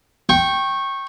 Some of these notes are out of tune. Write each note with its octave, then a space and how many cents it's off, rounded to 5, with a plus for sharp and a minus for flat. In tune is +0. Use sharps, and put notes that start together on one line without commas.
G5 -5 C#6 -20